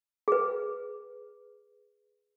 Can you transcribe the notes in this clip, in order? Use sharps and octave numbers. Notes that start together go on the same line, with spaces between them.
G#4 B4